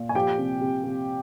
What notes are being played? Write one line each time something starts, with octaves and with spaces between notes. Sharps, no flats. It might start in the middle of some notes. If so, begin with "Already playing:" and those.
Already playing: A#2
G#5
F3 G4 G5
C3
C3
C3